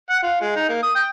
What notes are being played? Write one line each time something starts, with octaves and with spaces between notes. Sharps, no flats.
F#5
F4
G#3
D#4
A#3
D#6
G5